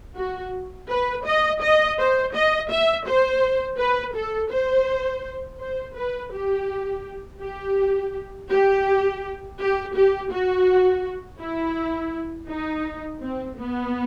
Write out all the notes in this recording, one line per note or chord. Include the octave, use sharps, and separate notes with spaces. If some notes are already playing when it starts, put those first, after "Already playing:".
F#4
B4
D#5
D#5
C5
D#5
E5
C5
B4
A4
C5
C5
B4
G4
G4
G4
G4
G4
F#4
E4
D#4
C4
B3